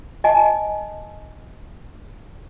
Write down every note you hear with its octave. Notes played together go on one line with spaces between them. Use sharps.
D#5 G#5 A5